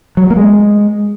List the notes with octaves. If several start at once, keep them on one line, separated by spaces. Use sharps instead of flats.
F#3
G3
A#3
G#3